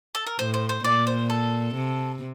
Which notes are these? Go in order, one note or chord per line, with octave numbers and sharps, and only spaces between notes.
A4
A#4
A2 C5
C5
C5
A#2 D5
C5
A4
C3